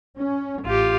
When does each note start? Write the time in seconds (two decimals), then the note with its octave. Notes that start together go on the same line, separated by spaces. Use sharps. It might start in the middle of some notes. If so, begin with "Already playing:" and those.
0.19 C#4
0.66 A1 F4 G4